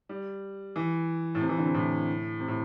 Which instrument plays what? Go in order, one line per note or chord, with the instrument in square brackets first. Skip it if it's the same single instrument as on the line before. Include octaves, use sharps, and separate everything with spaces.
[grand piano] G3
E3
A2
C3
E3
D3
C3
A2
C3
A2